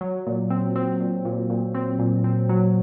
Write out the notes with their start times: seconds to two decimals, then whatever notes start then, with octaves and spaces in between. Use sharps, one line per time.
0.01 F#3
0.27 A#2
0.50 C4
0.76 C4
1.01 A#2
1.25 A#2
1.50 A#2
1.75 C4
1.99 A#2
2.24 C4
2.49 F#3